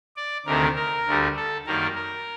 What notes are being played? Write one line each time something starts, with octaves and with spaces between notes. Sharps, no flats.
D5
D2 C3 D#3 A3 A#4
A#4
D2 D3 G3
A4
F#2 D#3 G3 A#3 A#4
A#4